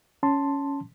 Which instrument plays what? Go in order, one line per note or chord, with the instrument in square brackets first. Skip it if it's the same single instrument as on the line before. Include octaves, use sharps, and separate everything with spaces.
[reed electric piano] C#4 A5 C6